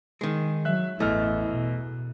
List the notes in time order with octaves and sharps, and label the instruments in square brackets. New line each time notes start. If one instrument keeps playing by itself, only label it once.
[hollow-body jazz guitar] D#3 G#3
[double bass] F#3 [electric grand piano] E5 F#6
[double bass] A1 E4 [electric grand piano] E2 D#5 F6 [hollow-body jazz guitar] A3
[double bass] B2